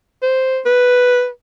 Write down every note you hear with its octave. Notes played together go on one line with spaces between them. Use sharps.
C5
B4